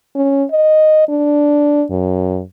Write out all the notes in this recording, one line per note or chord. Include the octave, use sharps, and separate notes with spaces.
C#4
D#5
D4
F#2